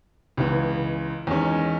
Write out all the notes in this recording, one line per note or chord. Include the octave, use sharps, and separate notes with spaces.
C#2 C#3 E3 G#3 B3
E2 D#3 G#3 C#4